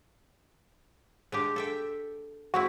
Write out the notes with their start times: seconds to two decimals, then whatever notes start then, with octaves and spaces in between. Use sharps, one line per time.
1.32 G#3 D4 G4
1.56 A4 E5 G5
2.54 G#3 C4 E4 F#4